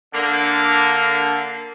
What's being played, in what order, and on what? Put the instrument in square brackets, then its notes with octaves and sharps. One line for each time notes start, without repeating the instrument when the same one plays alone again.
[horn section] D3 A#3